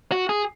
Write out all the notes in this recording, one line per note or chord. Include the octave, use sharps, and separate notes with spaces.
F#4
G#4